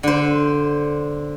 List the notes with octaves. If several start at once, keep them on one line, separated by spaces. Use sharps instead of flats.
D3 C5